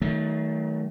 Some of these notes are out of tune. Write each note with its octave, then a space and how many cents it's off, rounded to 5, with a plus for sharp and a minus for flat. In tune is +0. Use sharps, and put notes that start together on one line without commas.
D#3 +35 F#3 +35 A3 +0